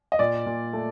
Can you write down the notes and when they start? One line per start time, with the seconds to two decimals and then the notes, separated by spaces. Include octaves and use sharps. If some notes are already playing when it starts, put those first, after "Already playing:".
0.12 D#5
0.19 A#2 D5
0.46 A#2
0.73 A3